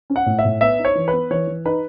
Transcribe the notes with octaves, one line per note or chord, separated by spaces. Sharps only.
C#4
F#5
A2
E5
A2
B3 E5
D#4
C#5
E3
B4
B3
E3 C#5
E3
D#4 B4